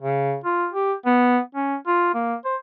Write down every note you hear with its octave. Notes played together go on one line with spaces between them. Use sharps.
C#3
F4
G4
B3
C#4
F4
A#3
C5